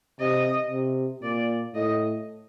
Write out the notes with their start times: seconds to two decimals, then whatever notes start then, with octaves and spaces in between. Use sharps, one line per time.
0.20 C3 D#5
0.71 C3
1.22 A#2 D5
1.74 A2 D#5